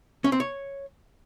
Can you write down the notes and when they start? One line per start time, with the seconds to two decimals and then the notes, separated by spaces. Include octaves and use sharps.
0.24 C#4
0.32 C4
0.40 C#5